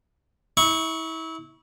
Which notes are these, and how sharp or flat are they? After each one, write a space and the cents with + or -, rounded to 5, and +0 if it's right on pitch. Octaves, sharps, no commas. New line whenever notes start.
E4 -30 C#6 +0